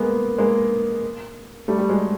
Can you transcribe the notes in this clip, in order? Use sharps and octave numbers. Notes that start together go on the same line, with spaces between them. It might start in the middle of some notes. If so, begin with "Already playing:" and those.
Already playing: G#3 A#3 B3
G#3 A#3
G3 A3
G3
F#3 G#3